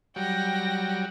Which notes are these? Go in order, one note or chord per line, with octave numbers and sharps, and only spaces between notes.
F#3 G3 G5 A#6